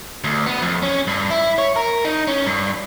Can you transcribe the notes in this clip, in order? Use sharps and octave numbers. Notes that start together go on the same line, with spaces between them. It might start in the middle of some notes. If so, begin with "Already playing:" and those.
D2
B3
F2
C#4
G2
E4
C#5
A#4
D#4
C#4
G2